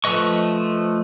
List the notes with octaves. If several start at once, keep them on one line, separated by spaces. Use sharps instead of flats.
F3 A3 B4 D#5 C#6